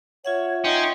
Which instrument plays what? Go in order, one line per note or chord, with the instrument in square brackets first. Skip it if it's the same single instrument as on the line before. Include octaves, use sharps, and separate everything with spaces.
[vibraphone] F4 E5 F#5 [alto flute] C#5
[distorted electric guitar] C#4 [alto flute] D#4 [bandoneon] G5 C6